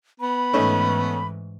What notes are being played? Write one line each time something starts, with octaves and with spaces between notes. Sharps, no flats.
B3 B5
G#2 E3 A3 C#4 D#4